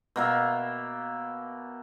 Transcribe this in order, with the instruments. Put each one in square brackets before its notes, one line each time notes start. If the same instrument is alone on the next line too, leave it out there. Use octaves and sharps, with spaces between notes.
[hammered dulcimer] B2 A#3 E5